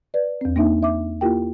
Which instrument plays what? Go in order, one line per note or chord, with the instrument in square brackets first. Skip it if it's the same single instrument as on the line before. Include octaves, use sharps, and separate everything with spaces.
[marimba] B4 D5
E2 C4
A#3 D4 D#4 E5
E5 D6
A#3 E4 F4 G4 A#4 G5